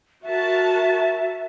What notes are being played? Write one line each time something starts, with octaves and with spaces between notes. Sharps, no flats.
F#4 A#4 E5 A5